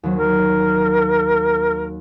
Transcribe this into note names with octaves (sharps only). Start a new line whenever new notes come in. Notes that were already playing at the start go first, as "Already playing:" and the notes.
D#2 F#3
A#4